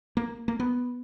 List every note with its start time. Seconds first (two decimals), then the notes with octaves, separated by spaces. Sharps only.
0.17 A#3
0.48 A#3
0.60 B3